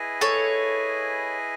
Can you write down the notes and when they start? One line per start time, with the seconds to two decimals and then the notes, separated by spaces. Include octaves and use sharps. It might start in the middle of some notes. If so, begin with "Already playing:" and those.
Already playing: E4 G#4 B4 D#5 G#5
0.21 A4 C#5